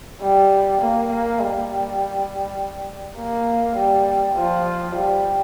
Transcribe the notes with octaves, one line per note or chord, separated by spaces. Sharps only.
G3
A#3
A#3
G3
A#3
G3
F3
G3